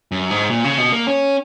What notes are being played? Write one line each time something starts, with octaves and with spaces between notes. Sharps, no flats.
F#2
G#2
A#2
C#3
B2
A#3
C#4